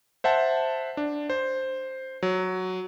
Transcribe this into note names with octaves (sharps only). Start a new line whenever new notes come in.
C5 E5 F#5 A5
D4
C5
F#3